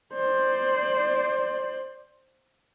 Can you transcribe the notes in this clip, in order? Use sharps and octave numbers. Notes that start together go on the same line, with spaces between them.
C5 D5